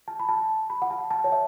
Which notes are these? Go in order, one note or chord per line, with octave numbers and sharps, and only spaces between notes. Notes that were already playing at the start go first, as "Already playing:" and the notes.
A5
B5
A5
B5
F#5
A5
A5
C#5
E5